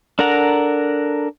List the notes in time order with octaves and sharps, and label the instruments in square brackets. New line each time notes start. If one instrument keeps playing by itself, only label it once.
[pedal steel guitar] D4 A4 A#4 F#5 A#5